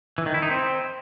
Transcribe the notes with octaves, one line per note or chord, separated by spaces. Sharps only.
E3
D#3
E4
D#4
C4